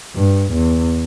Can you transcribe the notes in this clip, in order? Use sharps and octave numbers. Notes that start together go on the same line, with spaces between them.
G2
E2